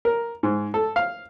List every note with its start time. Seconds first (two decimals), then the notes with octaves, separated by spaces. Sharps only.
0.05 A#4
0.43 G#2
0.74 A4
0.96 F5